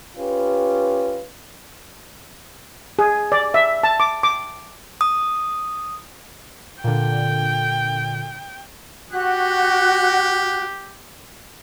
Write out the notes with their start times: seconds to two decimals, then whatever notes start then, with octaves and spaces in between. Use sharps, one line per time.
0.17 C#4 F4 G4 B4
2.99 G#4
3.32 D5
3.54 E5
3.84 A5
4.00 D6
4.23 D6
5.01 D#6
6.84 A#2 D3 G5
9.11 F#4 G4 F#6